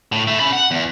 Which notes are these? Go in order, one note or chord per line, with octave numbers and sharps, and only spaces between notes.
A2
A3 E4
C#4 B5
F#5
E2